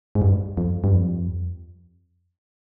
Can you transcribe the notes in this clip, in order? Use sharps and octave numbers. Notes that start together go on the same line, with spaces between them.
G#2
G2
F2
G2
F2